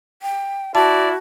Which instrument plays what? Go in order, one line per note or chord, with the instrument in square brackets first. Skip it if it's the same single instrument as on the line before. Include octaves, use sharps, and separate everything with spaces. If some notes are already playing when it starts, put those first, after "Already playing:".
[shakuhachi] G5
[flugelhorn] E4 [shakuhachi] F#4 [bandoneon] D5 [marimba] A5